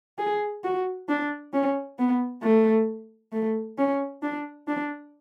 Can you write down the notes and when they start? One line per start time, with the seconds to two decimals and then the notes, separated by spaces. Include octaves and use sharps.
0.18 G#4
0.64 F#4
1.09 D4
1.53 C#4
1.98 B3
2.42 A3
3.32 A3
3.78 C#4
4.22 D4
4.68 D4